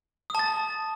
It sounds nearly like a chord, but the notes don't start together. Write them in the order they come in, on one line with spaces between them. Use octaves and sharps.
D#6 A5 A6